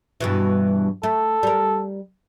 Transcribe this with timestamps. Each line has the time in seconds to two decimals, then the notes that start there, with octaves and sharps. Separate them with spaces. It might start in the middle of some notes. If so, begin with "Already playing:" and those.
0.20 G2 B2 E3
1.03 A3 A4
1.43 G3 A#4